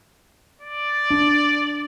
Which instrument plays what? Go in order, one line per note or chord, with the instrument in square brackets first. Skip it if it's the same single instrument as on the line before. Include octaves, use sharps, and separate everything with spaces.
[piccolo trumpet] D5
[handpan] D4